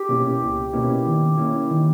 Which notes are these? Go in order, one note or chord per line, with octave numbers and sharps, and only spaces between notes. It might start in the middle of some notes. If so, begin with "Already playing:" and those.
Already playing: G4
B2 A#3 C#4 E4
C#2
B2 A#3 C#4 E4
D#3
A#3 C#4 E4
D#3